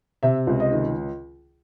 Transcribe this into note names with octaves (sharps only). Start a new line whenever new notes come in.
C3 E5
C#2
D#5
D#3